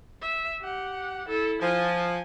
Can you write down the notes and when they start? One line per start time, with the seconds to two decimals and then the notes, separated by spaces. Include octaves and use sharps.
0.21 E5
0.61 G4 F#5
1.28 E4 A4
1.62 F3 G#5